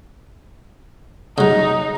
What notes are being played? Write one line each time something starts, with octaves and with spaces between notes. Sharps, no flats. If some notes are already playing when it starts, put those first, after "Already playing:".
C#3 F#3 D#4